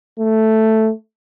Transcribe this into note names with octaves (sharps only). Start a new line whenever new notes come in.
A3